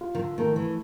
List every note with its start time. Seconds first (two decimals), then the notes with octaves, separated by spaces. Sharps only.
0.01 F4
0.15 D#3
0.19 D3
0.38 D#3 A3
0.56 E3